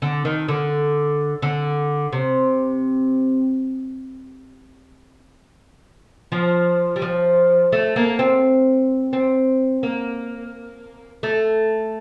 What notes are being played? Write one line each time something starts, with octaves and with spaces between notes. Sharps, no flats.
D3
D#3
D3
D3
C3
F3
G3
F3
A3
A#3
C4
C4
A#3
A3